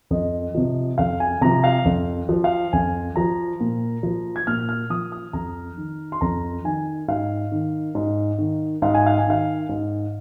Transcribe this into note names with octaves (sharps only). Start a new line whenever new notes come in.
F2 D#5
C3 F3
F2 F5
G#5
C3 F3 A#5
F5
F2
F3
F5
F2 G#5
F3 A#5
A#2
F3
G#6
A#2 F6
F6
F3 D#6
D#6
F2 A#5
D#3
C6
F2 A#5
D#3 G#5
G#2 F5
D#3
G#2
D#3
G#2 F5
G#5
F5
G#5
D#3 F5
G#2